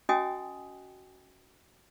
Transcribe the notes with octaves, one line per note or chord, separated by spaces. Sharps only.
C#4 F#4 D#5 G5 G#5 D#6